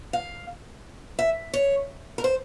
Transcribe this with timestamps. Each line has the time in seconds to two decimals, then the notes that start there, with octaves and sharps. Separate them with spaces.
0.13 F5
1.19 E5
1.53 C#5
2.18 A#4
2.24 C5